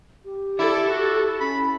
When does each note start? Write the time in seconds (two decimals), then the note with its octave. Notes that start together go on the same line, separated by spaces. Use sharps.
0.25 G4
0.59 E4 A4 D5
0.89 F#4
1.40 C#4 B5